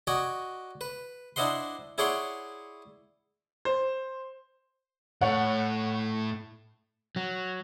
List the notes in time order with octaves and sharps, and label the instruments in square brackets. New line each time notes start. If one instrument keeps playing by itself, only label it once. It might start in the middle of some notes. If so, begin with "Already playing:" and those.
[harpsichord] F#4 D5 D#5 G#5
B4
D4 E4 C5 D#5 F#5 C6
E4 G#4 C#5 D5 F#5 C6
[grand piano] C5
[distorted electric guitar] A2 [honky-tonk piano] C#5 F#5
[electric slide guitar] F#3